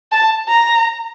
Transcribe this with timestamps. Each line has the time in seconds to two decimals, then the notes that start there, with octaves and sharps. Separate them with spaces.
0.12 A5
0.48 A#5